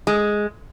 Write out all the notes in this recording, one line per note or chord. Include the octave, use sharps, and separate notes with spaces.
G#3